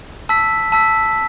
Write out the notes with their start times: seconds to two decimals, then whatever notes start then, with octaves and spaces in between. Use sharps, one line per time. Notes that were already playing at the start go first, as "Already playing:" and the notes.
0.29 A5 E6 B6
0.72 A5 E6 B6